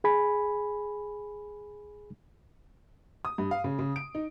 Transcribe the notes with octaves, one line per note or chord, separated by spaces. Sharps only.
G#4 G#5 B5
D#6
G2
F5
C#3
C#3
D7
D#4